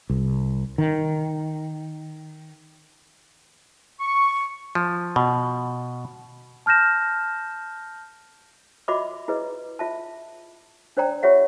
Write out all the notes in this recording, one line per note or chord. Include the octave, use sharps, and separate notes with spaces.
C2
D#3
C#6
F3
B2
A5 F6 G6 A#6 E7
F4 F#4 D#5 E5 B5 D6
E4 G#4 B4 D#5
F4 E5 A5
D4 C5 D5 G5 A#5
F4 G4 C#5 E5 F#5